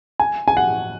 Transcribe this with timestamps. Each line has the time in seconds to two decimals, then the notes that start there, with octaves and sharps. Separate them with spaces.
0.20 G#5
0.48 G#5
0.57 F#5